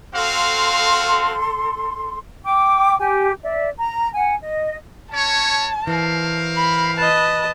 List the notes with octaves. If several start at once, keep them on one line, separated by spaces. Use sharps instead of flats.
C4 F#4 A4 F5 C6
G5 D6
G4 G#5
D5 E5
A#5
F#5 G#5
D#5
C#4 C#5 A5
E3 A#4 C5 F5
B5
B4 D#5 A5